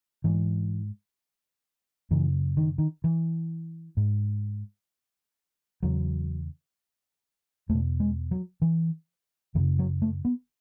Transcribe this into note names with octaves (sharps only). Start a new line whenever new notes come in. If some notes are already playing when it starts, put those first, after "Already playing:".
G#2 E3
F#2 C#3 E3
D#3
D#3
E3
G#2
E2 C#3 F#3
E2 B2 A3
G#3
F#3
E3
F#2 E3
C#3
F#3
A3
B3